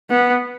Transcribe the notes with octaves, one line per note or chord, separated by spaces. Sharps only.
B3